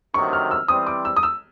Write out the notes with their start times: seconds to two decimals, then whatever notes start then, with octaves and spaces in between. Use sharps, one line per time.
0.14 D2 C3 D#3 F#3 C#6
0.33 F6
0.51 E6
0.68 E3 G3 C4 D#6
0.87 D6
1.05 E6
1.16 D#6
1.23 E6